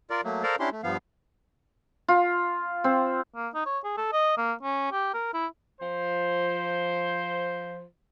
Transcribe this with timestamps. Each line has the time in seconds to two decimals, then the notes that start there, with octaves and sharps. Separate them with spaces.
0.10 F4 A#4 D5
0.24 F#3 A3 A#3
0.43 A4 A#4 C5 D5 F5 A#5
0.60 C#4 D4 E4 G4 C6
0.72 A3
0.84 G2 F3 B3 F5
2.08 F4
2.84 C4
3.35 A#3
3.54 D#4
3.66 C#5
3.84 G#4
3.97 A4
4.13 D#5
4.38 A#3
4.63 C#4
4.92 G4
5.14 A#4
5.34 E4
5.80 F3 C5